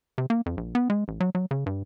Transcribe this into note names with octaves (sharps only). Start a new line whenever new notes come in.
C3
A#3
F2
A#1
B3
G#3
A1
F#3
F#3
C#3
G2